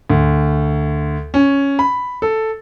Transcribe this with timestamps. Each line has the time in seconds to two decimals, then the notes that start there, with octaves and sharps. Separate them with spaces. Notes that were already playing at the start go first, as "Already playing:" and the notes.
0.10 D2
1.34 C#4
1.79 B5
2.22 A4